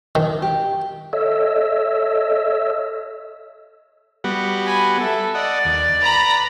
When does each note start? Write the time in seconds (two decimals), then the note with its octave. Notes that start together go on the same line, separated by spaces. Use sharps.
0.15 D#3
0.42 G4
1.13 A4 C#5 D#5 E5 E6
4.24 G3 B3 F#4
4.66 G#5 B5
4.97 A4 E5
5.35 D5 D#5 F#5
5.65 D#2
6.02 B4 A#5 B5